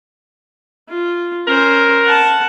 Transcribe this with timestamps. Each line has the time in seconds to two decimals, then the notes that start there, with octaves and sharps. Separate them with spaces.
0.89 F4
1.47 C#4 A#4 C5
2.04 F#5 A5